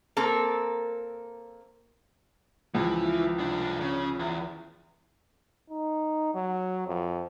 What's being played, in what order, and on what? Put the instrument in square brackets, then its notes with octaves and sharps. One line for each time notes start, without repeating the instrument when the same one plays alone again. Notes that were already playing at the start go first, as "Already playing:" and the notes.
[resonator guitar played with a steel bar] A#3 C4 A4 A#4
[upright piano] C#2 F3 [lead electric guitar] E3
[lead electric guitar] C2 D4
C#3
E2
[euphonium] D#4
F#3
F2